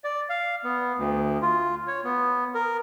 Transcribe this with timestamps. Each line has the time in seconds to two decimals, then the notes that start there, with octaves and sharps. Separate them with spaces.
0.04 D5
0.30 F5
0.64 B3
0.98 D2
1.42 F4
1.88 C#5
2.04 B3
2.55 A#4